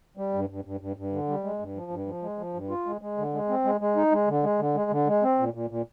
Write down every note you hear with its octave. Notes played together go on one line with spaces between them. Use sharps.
G3
G2
G2
G2
G2
G2
D3
G3
G#3
G2
F3
G2
F3
G#3
F3
G2
F4
G#3
G#3
D3
G#3
C4
G#3
G#3
D#4
G#3
D3
G#3
D3
G#3
D3
G#3
C4
A#2
A#2
A#2